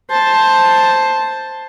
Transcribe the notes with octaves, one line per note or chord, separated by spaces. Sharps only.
C5 A5